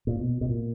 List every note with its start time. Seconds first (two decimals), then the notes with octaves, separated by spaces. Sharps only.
0.07 A#2
0.19 B2
0.41 B2
0.49 A#2